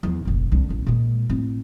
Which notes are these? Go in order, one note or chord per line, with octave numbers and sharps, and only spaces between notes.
E2 F3
F1 A#1
C2 D3
D1 A1
A#2 G#3
A2 C4